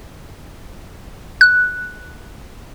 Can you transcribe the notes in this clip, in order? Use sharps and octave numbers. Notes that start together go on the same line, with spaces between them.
F#6